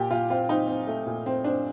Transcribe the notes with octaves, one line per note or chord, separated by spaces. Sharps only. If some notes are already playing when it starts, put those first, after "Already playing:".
Already playing: A#2 G4
A#2 F4
C4 F4
C4 D#4
C4
A3
A#2
C4
C4 D4